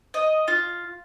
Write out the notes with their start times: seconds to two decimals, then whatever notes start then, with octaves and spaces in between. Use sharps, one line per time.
0.14 D#5
0.48 F4